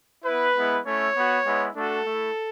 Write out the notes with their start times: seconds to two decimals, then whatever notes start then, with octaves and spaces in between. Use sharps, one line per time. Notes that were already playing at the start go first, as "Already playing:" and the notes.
0.25 B3 E4 B4
0.56 G#3 B3 E4
0.85 A3 C#4 E4 C#5
1.15 B3 F#4
1.45 G#3 B3 E4
1.75 A3 D4 F#4 A4
2.05 A3
2.10 E4